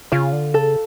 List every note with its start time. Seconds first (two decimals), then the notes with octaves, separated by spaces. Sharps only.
0.12 C#3 F4
0.33 D3
0.54 C#3 A4